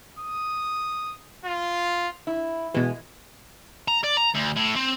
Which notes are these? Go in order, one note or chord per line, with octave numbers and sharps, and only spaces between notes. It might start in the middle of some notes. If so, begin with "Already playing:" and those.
D#6
F4
E4
B2 E3 G#3
A#5
D5
A#5
D2
A2
C4